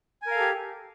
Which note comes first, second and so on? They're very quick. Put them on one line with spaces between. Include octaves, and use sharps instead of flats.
G#5 A#4 F5 A4 G4